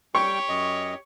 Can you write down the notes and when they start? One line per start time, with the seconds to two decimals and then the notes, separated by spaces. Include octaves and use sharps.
0.15 G3 G4 C#5 G5 C#6
0.49 F#2 D#5